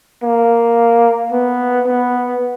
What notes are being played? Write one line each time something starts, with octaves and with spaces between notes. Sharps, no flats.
A#3
B3
B3